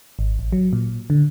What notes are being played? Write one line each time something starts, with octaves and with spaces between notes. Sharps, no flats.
G#1
A1
F#3
A#2
D3